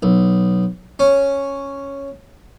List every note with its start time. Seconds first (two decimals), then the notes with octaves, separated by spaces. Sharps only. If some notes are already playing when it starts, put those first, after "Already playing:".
0.03 B1
0.99 C#4